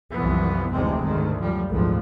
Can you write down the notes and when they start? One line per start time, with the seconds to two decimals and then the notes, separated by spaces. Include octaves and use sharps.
0.14 C2 F#2 E3 F3 B3
0.72 F1 D2 C3 E3 G#3 C4
1.04 D2 G#2 D#3
1.40 F#2 F3 G3
1.70 G#1 D2 A#2 F3